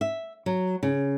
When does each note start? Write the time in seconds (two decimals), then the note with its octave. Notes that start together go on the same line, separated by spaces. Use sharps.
0.01 E5
0.46 F#3
0.83 C#3